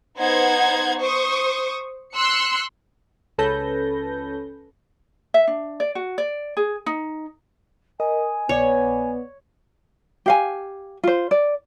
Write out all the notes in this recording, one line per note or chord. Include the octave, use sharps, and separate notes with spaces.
B3 D#4 C5 F#5 G#6
C5 C#6 D#6
C6 E6 F#6 C#7
C#2 C#4 A4 B4 G6 A#6
E5
D4
D5
F#4
D5
G#4
D#4
A#4 D#5 G#5 D#6
A#1 B3 C#5 D5
G4 F5 G#5
F4 C5
D5